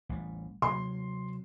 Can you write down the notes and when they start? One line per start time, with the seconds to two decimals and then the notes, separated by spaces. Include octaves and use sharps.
0.09 A1 G3
0.62 C3 F#3 C6